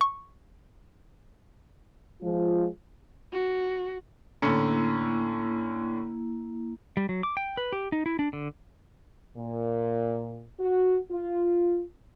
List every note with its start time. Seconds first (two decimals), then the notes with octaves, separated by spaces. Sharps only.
0.01 C#6
2.21 F3 G#3 F4
3.33 F#4
4.42 A2 D3 A#3 C#4 E4
6.97 G3
7.09 F#3
7.23 D6
7.37 G5
7.57 B4
7.73 G4
7.92 D#4
8.06 E4
8.19 D4
8.33 D3
9.37 A#2
10.60 F#4
11.11 F4